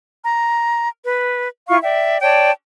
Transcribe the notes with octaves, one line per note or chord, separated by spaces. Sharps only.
A#5
B4
E4 F4 F5 C#6
D5 E5 G5
C#5 D5 G5 A5